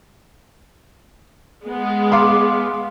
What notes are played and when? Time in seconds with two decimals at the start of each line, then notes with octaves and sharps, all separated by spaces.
1.65 G#3 B3
2.12 F5 C6 D6